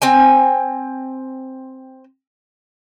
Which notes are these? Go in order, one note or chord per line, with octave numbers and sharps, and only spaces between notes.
C4 G5 G#5